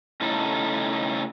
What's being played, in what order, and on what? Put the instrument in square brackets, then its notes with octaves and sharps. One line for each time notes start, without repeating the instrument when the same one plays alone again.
[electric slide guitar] C#3 A3 D#4 E4 A4